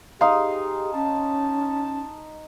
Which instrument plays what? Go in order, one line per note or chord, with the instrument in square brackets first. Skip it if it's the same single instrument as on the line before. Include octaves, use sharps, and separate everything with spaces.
[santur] D#4 C6 [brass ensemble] G4 G#4 [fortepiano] F5
[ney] C#4 [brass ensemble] A5